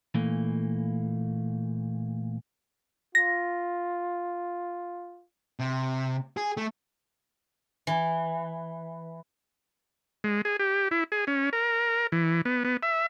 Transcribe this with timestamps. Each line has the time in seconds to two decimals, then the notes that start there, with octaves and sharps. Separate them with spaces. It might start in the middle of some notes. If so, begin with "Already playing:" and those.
0.14 A#2 E3 A3 A#3
3.15 F4 A#6
5.59 C3
6.37 G#4
6.57 A3
7.87 E3
10.24 G#3
10.45 G#4
10.59 G4
10.91 E4
11.12 G#4
11.27 C#4
11.53 A#4
12.12 E3
12.45 B3
12.64 B3
12.83 E5